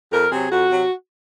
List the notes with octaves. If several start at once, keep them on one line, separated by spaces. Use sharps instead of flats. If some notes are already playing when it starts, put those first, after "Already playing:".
F2 A#4
C3 F#3 G#4
F2 F#4
C3 F#3